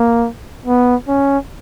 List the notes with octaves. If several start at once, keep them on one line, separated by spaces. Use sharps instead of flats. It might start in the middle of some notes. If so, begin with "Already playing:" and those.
Already playing: A#3
B3
C#4